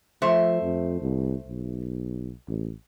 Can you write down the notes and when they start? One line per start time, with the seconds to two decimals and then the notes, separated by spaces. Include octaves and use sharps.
0.22 F3 A3 C5 E5
0.62 F2
1.01 C2
1.48 B1
2.48 A1